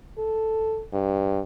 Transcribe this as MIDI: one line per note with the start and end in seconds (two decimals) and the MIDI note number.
0.19 0.83 69
0.93 1.41 43